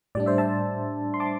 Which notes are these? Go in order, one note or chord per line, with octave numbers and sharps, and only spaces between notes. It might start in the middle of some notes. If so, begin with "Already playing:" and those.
A2 G3 D4 D5
C5 E5
E5 A5
C6
A5 D6